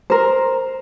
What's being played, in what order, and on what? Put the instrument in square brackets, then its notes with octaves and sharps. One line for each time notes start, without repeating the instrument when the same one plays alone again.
[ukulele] A#4 C5